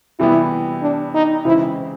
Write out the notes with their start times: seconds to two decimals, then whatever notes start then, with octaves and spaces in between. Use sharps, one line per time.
0.19 C3 E3 G3 B3 E4
0.82 D4
1.14 D#4
1.45 C#3 E3 G#3 C4 E4